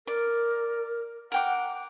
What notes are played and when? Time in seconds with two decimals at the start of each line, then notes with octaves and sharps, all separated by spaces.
0.07 A#4 D5
1.32 A#4 F#5 G5 D6